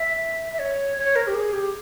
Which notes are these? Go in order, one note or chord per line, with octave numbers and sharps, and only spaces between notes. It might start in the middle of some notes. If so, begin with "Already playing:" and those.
Already playing: E5
E5
C#5
C#5
A#4
G4
G#4
G4